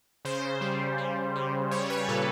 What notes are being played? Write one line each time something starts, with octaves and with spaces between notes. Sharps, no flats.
C#3 C5
G3
G3
C#3
G3 C#5
B4
A#2 A4